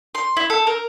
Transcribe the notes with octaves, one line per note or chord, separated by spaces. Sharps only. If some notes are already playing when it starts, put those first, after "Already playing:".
C6
E4
A4
A#4